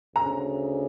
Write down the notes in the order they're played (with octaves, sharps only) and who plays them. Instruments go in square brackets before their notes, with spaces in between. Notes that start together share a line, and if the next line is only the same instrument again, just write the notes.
[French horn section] D2 C#3 [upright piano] A#5